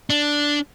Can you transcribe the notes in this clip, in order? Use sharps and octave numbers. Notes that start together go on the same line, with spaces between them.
D4